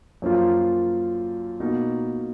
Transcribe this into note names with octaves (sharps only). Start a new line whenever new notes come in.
F#2 F3 A#3 F4
B2 A#3 D#4